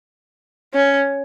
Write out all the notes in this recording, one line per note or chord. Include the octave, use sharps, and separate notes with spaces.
C#4